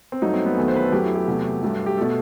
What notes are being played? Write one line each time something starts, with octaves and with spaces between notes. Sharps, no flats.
C4
G2 F#3 A3 D#4
C4
B3
E2 D#3 F#3 A3
C5
B4
A4
F#2 F#3 A3 G4
E4
G4
E2 C3 F#3 A3
G2 F#3 A3
G4
B2 A3 A4